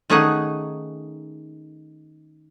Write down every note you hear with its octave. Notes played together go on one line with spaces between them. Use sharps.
D#3 A3 C#4 D#4 G#4 F#5